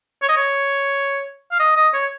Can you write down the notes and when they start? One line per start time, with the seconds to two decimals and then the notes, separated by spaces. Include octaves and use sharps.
0.22 C#5
0.29 D#5
0.36 C#5
1.51 F5
1.60 D#5
1.76 D#5
1.94 C#5